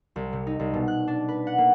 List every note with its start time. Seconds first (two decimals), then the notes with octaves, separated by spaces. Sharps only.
0.16 C2
0.33 C3
0.47 D#4
0.60 C2
0.74 B2
0.88 F#6
1.08 D4
1.28 B4
1.47 F#5
1.58 A#3